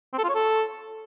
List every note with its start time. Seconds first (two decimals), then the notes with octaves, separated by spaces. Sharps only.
0.13 C4
0.18 A4
0.24 F4
0.29 C#5
0.35 A4